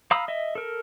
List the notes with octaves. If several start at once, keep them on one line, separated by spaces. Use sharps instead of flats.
F5 A#5 B5 D#6 E6
D#5 E5
A4 A#4